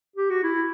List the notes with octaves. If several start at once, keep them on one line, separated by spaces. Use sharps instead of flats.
G4
F#4
E4